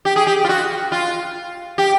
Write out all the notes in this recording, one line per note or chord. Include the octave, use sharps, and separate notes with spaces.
G4
G#4
G4
F4
F#4
F4
G4